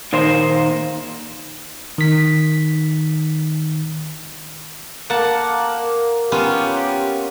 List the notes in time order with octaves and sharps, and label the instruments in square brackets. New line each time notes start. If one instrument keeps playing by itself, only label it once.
[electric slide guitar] A#2 D#3 A#3 C5
[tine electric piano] D#3 B6
[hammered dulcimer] A#3 [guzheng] F#5 A5
[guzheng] B3 C#4 F4 [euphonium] G4